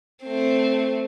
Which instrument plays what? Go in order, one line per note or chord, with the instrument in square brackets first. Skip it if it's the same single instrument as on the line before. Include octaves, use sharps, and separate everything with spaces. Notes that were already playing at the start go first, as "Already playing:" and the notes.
[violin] A3 C4